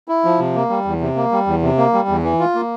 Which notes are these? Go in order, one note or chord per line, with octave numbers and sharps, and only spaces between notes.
E4
F3
C3
A#3
G3
E2
C3
A#3
G3
E2
C3
A#3
G3
E2
E3
F4
A#3